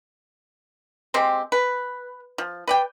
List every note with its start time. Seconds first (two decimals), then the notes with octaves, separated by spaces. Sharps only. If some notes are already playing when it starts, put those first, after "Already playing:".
1.14 G#3 C4 G4
1.52 B4
2.38 F3
2.68 B4 D5 G5